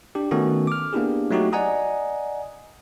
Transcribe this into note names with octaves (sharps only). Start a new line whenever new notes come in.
D4 G4
D#3 A3 B3 C#4 F#4 A4
D6 F6
A#3 B3 D4 E4 G4 G#4
F#3 A3 D#4 F#4 G4
D5 D#5 F#5 G#5 A#5 D#6